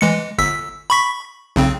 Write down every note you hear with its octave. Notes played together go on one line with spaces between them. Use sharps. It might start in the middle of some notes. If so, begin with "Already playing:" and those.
E3 G#3 C#7
G1 E6 B6
B5 C#6 B6
B1 C#3 C4